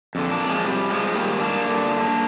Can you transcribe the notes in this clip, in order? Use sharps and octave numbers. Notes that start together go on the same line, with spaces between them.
F2 D3
A#3 D4
F3 G#3
F2 C3 G3
F3 G#3
G#2 D#3 G3 A#3
A#3 D4
G2 D3